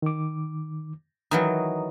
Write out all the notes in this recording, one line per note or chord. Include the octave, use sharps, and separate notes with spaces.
D#3 D6
D#3 E3 F#3 A#5 D#6